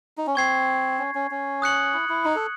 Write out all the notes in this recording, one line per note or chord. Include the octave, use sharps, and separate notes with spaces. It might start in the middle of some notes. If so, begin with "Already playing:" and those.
D#4
C#4
C4 C#6 G#6 C7
C#4
C#4
C#4
D#6 F#6 C#7 F#7
E4
E4
D#4
A4